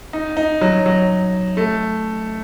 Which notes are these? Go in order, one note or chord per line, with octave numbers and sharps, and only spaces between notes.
D#4
D#4
F#3
F#3
A3